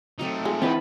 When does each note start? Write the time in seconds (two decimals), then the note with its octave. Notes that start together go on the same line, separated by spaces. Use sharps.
0.19 F#3 A3 C4 D#4 D#5
0.45 G#3 F4
0.62 D#3 E3 C4 E4 B4 A5 B5